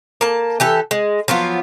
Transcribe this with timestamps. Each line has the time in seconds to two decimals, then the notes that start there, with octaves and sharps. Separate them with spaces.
0.21 A#3 A5
0.60 E3 G4 A4
0.91 G#3
1.28 F3 F#3 B3 F4